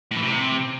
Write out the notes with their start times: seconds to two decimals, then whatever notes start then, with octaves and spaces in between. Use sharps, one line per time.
0.11 A2
0.16 E3
0.21 C3